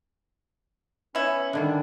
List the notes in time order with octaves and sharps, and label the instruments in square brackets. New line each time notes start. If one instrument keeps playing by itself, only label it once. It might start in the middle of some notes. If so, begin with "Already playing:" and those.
[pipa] B3 E4 [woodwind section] C#4
[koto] D3 D#3 G3 [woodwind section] D4